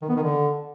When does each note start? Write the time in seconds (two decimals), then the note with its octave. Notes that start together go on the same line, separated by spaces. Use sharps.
0.02 D#3
0.09 B3
0.16 D#3
0.23 D3